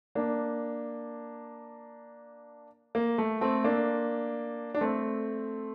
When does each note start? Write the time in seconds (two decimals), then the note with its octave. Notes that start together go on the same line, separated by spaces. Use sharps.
0.15 A#3 D4
2.95 A#3
3.18 A3
3.41 A3 C4
3.64 A#3 D4
4.74 D4
4.81 A3 C4